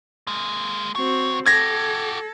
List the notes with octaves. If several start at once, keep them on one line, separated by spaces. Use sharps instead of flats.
G#3 A#3
C#2 C4 F#4 C#5
F#4 G4 A4 G#6 A#6